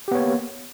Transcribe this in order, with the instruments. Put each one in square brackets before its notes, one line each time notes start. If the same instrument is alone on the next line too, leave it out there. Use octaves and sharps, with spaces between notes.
[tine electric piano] G4
B3
C#5
A#3